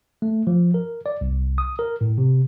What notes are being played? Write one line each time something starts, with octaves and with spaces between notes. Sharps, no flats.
A3
F3
A#4
D5
C2
D#6
A#4
A2
C3